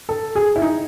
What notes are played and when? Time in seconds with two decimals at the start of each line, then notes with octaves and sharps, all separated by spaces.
0.09 A4
0.35 G#4
0.56 E4
0.62 D#4